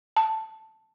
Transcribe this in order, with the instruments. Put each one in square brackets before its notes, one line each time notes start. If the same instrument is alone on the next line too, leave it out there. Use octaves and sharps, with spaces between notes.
[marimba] A5